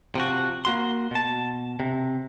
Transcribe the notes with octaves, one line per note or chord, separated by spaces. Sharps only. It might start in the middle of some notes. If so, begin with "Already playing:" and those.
C3 F3 F#4
A#3 F#4 C6
B2 A5
C3